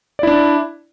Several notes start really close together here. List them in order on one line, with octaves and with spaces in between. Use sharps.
D5 E4 D4